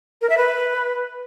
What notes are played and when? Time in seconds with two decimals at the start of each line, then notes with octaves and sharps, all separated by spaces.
0.22 A#4
0.30 E5
0.37 B4